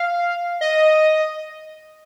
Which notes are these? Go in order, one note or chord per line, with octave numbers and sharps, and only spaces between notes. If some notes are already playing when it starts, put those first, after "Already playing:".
Already playing: F5
D#5